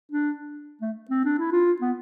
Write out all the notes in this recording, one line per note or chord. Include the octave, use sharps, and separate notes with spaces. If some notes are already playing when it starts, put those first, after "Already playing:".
D4
A3
C4
D4
E4
F4
B3